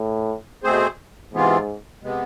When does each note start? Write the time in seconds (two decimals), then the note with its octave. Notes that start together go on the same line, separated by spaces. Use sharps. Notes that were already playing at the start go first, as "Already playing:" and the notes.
Already playing: A2
0.63 B2 A3 C4 G#4 C5
1.33 G#2 C3 E3 B3 F4
2.03 C3 G#3 B3